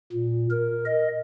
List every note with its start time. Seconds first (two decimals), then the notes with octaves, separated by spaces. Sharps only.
0.13 A#2
0.51 A#4
0.86 D#5